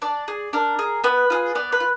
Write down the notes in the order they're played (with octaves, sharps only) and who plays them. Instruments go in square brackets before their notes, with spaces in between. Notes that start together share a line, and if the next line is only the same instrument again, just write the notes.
[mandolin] D4 D5
G#4
D4 A#4
G#4
B3 B4
F4 G#4
B3 D5
B4
F4